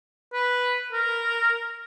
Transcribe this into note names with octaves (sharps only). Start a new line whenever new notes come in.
B4
A#4